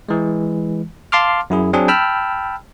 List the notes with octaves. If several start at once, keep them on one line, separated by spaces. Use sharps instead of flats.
E3 G#3
F5 A5 C6 D6 F6
F#2 E4 G#4
F#3 C4 D4 G#4
G5 A5 B5 E6 F6